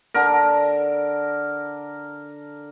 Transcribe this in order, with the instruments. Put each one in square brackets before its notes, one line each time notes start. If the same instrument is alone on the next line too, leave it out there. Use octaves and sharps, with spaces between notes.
[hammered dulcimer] D3 A#4